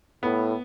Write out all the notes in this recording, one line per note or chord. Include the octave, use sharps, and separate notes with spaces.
A2 B3